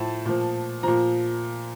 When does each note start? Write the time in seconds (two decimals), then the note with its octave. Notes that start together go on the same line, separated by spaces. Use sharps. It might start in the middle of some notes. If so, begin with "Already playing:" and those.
Already playing: A2 F3 A5
0.25 A#2 F3
0.83 A#2 F3 A#5